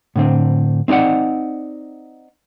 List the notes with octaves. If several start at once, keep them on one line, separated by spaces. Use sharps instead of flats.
A2 D3 C4
C4 D#4 F4 D5 F#5